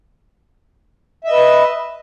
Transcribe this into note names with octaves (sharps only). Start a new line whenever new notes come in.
B4 D#5 E5